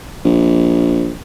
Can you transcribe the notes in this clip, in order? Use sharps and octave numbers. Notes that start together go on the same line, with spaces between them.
A#1